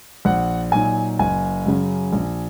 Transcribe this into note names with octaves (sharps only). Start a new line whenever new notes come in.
A#1 F#5
A#2 F#3 D#4 G#5
F#1 G#5
F#2 C#3 F#3
A#1